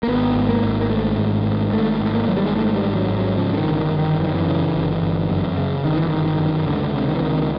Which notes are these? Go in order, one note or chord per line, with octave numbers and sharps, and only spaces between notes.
A#3
G#1 B3
G#2
A#3
G#1
A#3
G#2 A3
G#1
G#2
G#1 A3
G#2 A3
A#3
G#1 F#3
G3
G#3
G#2 A3
G3
G#1
F#3
G#2
F#3
C#3 F3
D3
D#3
G1
D#3
G1
D#3
F#2 E3
D#3
E3
C#3
G1
G1
F#2
C#3
G1 D#3
E3
G1 D#3
D#3
F#2
C#2 D3
C3
D#3
E3
C#2 D#3